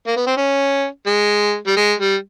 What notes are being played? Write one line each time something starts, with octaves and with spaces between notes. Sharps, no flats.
A#3
B3
C4
C#4
G#3
G3
G#3
G3